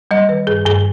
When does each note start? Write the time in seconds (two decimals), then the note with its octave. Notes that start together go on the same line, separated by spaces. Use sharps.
0.11 G3 D#5
0.29 D#3 B4
0.47 G2 G#4
0.65 G2 G#4